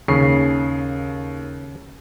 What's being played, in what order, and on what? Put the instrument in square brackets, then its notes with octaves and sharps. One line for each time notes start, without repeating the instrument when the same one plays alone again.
[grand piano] D#2 C7 [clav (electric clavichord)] C#3